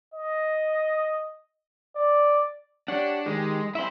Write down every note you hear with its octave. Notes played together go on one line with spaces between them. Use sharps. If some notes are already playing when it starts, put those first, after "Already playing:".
D#5
D5
D4 G4 C#5 F#5
D#3 G#3 G4
C4 E4 E5 B5 C6